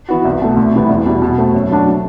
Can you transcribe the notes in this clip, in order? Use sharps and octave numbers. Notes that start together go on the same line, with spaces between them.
E3 B3 F#4
C2
B2 A3
D2
C3 E3 G3 B3
E2
B2 G3
B2
A3 C4 F#4
F#2
F#3 A3 D4 F#4